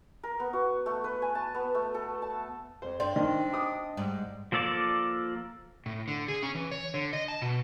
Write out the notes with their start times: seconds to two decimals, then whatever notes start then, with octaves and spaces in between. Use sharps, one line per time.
0.23 A#4
0.40 B3
0.53 F#4
0.86 A3
1.04 B4
1.22 G#5
1.35 A5
1.54 B3
1.75 A3
1.94 A4
2.22 A5
2.82 F2 C5
3.00 G2 C4 D5
3.16 D#3 D4 D#5
3.53 D6 D#6
3.97 G#2 G3
4.52 F3 A#3 A4 D5 D6
5.86 A2
6.08 D3
6.28 G#4
6.43 C#4
6.55 E3
6.71 C#5
6.94 D3
7.13 D#5
7.28 A5
7.42 B2